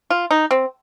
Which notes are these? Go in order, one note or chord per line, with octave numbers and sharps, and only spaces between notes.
F4
D#4
C4